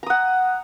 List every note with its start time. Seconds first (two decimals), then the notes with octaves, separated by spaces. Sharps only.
0.03 A#5
0.06 D#6
0.10 F#5